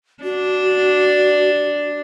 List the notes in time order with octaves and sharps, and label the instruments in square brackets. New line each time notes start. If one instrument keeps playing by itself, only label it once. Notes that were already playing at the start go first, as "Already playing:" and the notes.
[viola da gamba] D4 [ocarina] F#4